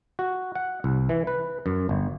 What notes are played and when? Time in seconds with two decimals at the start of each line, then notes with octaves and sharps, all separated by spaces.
0.19 F#4
0.55 F#5
0.84 C2
1.09 E3
1.27 B4
1.66 F#2
1.89 G1